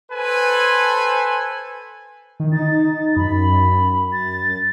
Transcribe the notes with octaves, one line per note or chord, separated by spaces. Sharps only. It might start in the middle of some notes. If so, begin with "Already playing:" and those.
A4 B4 C5 G#5
D#3
D#4 A6
F#2 B5
A6